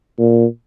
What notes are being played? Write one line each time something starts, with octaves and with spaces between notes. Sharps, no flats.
A#2